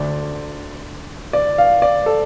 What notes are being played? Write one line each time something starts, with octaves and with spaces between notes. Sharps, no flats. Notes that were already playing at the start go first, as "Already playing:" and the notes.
Already playing: D2 D3 D5
D5
F5
D5
A4